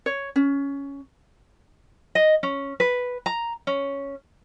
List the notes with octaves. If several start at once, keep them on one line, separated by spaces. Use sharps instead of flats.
C#5
C#4
D#5
C#4
B4
A#5
C#4